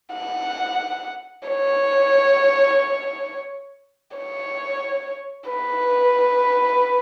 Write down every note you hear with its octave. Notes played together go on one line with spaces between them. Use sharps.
F#5
C#5
C#5
B4